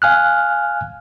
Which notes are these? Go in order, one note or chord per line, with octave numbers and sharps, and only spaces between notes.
F5 G#5 F6 F#6